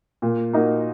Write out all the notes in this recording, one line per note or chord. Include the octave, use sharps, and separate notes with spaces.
A#2
A#3 D#4 F#4